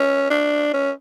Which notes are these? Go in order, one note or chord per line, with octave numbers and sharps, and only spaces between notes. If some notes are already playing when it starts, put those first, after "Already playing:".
Already playing: C#4
D4
C#4